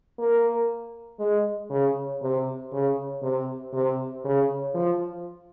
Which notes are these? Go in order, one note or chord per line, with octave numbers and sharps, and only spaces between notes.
A#3
G#3
C#3
C3
C#3
C3
C3
C#3
F3